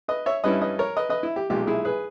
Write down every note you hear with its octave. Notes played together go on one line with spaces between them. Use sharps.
B4 D#5
C#5 E5
G2 G3 C#4 E4 B4 D#5
B4 D#5
A#4 C#5
B4 D#5
B4 D#5
E4
G4
B1 A#2 G#3 G4
E4 G#4
G#4 B4